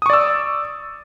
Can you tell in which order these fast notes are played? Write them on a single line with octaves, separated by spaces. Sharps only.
D#6 C#6 D5 E6